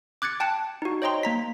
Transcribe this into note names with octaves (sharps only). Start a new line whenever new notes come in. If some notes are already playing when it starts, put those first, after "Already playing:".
D6 F#6 G#6 A6 C#7
G5 A5 F#6 C#7
D#4 F#4
C5 C#5 D#5 G5 A#5 C6
A#3 A#5 B6